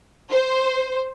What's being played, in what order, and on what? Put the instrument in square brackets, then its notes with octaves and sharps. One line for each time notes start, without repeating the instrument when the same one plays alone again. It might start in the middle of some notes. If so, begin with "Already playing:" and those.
[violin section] C5